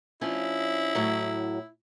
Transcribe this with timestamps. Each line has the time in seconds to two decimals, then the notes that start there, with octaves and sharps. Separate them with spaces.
0.21 F3 C#4 D4 E4
0.95 A2 F#3